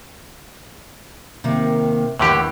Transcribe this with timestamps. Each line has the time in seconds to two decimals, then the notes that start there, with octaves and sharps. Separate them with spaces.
1.44 C3 D#3 A#3
2.19 D#2 A2 D3 E3 G4